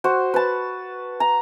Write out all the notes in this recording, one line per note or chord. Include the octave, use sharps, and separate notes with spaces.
F#4 C5
B4 A5
A#5